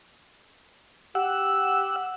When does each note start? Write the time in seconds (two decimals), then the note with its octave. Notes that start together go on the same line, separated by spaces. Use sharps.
1.15 G4 F#5 E6